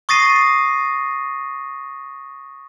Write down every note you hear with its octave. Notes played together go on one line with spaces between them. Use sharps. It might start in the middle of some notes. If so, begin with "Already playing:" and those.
C#6 D#6 A6 A#6 C7 D#7